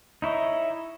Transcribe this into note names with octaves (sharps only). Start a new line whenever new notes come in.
D#4 E4 C#5 D#5